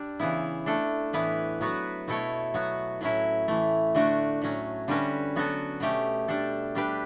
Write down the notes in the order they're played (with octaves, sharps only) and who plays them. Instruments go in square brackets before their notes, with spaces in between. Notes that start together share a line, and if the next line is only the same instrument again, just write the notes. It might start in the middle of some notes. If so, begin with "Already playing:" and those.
Already playing: [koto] G3 D4
C#3 E3 B3 E4
A3 D4 A4
A2 E3 B3 E4 B4
F#3 B3 F#4 B4
B2 A3 E4 A4 C#5
F#3 B3 F#4
A2 F#3 C#4 E4
A2 E3 A3
D3 A3 D4 F#4
A2 F#3 C#4
D3 G3 C#4 F#4 B4
F#3 B3 F#4 A4
B2 A3 C#4 G4
G3 D4 A4
G3 D4 G4 B4